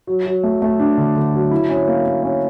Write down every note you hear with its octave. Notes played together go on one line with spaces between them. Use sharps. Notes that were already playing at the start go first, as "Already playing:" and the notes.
F#3
F#3
A3
A3
D4
D3
D3
F#3
E4
C#4
A#3
A#3
C#4